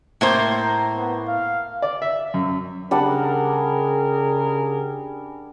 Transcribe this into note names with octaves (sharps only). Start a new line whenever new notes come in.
A2 A#3 C5
A#5
B3
F5
D5
E5
F#2
C#3 G3 D4 G#4 A#4 F#5